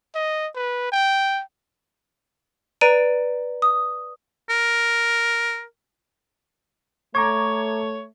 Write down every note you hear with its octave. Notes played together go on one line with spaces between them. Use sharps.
D#5
B4
G5
B4 D5 A#5 D7 D#7
D#6
A#4
A3 C#5 A#5 C#6 D6 G#6